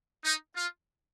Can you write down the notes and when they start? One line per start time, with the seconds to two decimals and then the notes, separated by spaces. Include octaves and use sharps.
0.24 D#4
0.55 F4